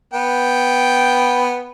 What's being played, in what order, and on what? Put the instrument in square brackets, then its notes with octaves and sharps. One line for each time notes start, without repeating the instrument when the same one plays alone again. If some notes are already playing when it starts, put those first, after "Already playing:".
[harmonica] B3 G5